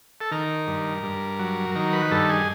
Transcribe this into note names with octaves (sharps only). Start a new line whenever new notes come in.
A4
D#3 A#4
G2
G2
F#3
D#3 A#4
B4
G2 A4
G#4